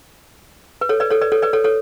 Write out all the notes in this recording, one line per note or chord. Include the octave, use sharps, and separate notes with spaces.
B4
A4 C#5
B4 D5
A4 C#5
B4 D5
A4 C#5
B4 D5
A4 C#5
A4 C#5